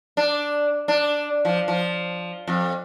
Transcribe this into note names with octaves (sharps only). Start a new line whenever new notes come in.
D4
D4
F3
F3
F2